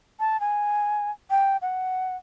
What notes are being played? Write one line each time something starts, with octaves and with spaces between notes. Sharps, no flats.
A5
G#5
G5
F#5